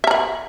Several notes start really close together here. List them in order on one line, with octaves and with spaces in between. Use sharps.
E5 A#5 B5